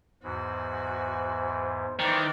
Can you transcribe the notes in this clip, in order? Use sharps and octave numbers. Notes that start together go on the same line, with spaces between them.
E2 G#2 E3 F#4 C5
D#3 E3 C5 D5